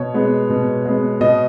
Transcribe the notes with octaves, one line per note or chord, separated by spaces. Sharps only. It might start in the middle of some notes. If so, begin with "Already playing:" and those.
Already playing: B2 C#5
G#3 B3
B2
G#3 B3
B2 D#5